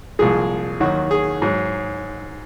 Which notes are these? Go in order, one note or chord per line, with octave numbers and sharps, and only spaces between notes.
C2 A#2 F3 G#3 G#4
D#2 D#3 F#3 F#4
G#4
G#2 F#3